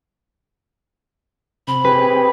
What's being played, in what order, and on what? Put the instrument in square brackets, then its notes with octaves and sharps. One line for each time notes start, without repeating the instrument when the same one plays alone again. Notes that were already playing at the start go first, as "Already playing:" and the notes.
[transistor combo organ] C3 [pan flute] B5
[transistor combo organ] C4 G4 G#4 [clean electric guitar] B4